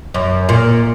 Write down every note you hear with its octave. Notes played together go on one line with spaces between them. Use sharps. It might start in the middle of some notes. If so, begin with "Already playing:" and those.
F#2
A#2